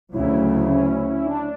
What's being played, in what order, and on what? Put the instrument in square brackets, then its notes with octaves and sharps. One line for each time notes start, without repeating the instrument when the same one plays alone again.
[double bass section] D2 C#3 F#3 [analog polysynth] E4
[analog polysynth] C#4
E4
D4